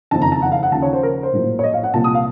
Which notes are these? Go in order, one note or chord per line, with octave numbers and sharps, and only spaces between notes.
F#1 F2 D#3 A5
A#5
A5
F#5
F5
F#5
D#2 C#3 F3 A5
C#5
C5
A#4
C5
A#1 A2 F#3 A#3
C#5
D#5
F5
F#5
C2 A#2 F3 A#3 A5
D#6
F5